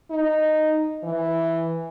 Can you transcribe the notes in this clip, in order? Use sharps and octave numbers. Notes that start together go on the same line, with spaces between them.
D#4
E3